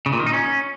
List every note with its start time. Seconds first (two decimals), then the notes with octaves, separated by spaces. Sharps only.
0.06 C#3
0.13 A#2
0.20 D#3
0.26 D#4
0.33 C#4